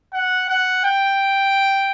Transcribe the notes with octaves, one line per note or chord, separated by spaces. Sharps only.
F#5
F#5
G5